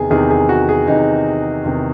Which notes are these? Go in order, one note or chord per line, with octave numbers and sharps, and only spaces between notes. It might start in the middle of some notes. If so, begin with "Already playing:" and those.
Already playing: E2 C3 D#3 G#4
E2 C3 D#3 G#4
G#4
F#4
G#4
E2 C3 D#3 D#4
E2 C3 D#3